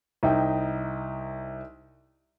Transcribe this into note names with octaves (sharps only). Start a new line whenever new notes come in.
C2 D#4 G5